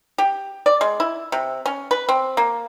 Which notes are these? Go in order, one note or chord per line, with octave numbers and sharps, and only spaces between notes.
G4
D5
G#3
E4
C3
C#4
B4
C4
A#3